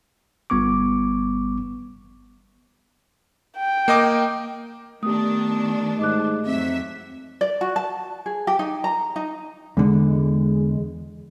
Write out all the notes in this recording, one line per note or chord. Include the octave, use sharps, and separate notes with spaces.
G1 G3 B3 C#6 D6
G5
A#3 D#5 D6
D#3 A3 B3 D4 G4 D#6
G#2 D#5 D6 F#6
F2 F#3 C4 E5
D5
F#4
A5
G#4
G4
D#4
A#5
D#4
E2 D3 G#3